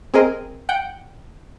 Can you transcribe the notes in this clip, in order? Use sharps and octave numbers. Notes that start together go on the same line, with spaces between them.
C4 G#4 A#4 D#5
F#5 G5